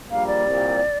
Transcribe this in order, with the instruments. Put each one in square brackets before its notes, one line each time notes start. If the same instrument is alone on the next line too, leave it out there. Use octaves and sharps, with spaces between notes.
[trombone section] A#1 A#2 G3 A#3 [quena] F5
[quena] D5
[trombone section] C2 A#2 G3